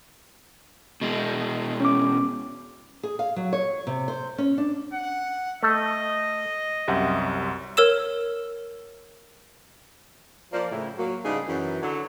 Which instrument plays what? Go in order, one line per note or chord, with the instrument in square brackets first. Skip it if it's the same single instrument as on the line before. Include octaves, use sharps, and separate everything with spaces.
[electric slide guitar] B2 G#3
[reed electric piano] C#4 D6
[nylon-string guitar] G#4
F5
F#3
C#5
C3
C5
C#4
D4
[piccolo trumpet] F#5
[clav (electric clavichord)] A3 A4 [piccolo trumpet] D#5
[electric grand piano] C2 F#2 [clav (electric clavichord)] G4 E5 F#5
[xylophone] A#4 C#5 E6 E7
[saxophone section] F3 A#3 D5
A2 C#3 E4
F#3 A#3
G#2 C#3 G3 D4 D#4 G#4
F#2 E3
D3 F#3